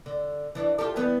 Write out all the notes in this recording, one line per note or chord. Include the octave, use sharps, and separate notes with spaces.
D3
E3 D4
F4 G4 A4
E3 G3 B3